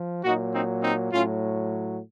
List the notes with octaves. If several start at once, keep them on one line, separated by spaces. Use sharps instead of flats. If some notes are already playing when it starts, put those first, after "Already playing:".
Already playing: F3
A#2 F#3 D#4 F#4
C4 D#4
C4 D#4
A2 F#3 C#4 F4